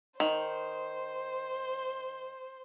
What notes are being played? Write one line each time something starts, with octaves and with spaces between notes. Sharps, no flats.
D#3 C5